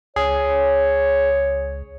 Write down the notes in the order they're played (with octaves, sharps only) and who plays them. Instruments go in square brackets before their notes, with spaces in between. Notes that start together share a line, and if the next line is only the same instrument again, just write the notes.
[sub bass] C#2 [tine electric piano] G#4 [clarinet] C#5